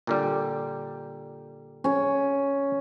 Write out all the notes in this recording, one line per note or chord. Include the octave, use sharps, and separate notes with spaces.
A#2 D3 G3
C#4 C#5